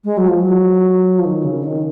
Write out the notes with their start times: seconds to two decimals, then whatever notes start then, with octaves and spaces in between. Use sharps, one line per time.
0.04 G#3
0.17 F#3
0.28 F3
0.40 F#3
1.19 F3
1.25 D#3
1.44 C#3
1.64 D#3